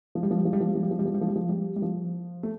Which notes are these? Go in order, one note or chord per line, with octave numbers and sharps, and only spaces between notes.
F3
G3
F3
G3
F3
G3
F3
G3
F3
G3
F3
G3
F3
G3
F3
G3
F3
G3
G3
F3
A3